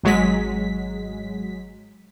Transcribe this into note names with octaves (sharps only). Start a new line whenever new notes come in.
G#1 F#3 G#3 B6